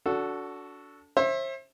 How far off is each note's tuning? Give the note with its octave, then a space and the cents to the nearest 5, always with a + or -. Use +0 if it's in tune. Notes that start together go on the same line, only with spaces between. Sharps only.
D4 -30 F#4 +0 A4 +0
C5 +40 E5 +0